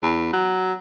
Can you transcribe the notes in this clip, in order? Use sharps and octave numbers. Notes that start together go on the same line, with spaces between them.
E2
F#3